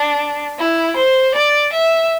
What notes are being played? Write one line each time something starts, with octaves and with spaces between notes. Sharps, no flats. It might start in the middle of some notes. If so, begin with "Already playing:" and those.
Already playing: D4
E4
C5
D5
E5